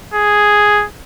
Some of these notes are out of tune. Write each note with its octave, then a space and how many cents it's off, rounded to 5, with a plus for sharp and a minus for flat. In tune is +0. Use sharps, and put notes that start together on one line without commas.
G#4 +0